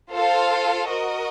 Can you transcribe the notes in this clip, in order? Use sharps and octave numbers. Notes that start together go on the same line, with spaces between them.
F4 A4 C5 F5
F#4 A#4 D#5